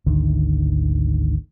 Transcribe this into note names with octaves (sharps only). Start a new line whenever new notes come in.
G#1 D2 D3 D#3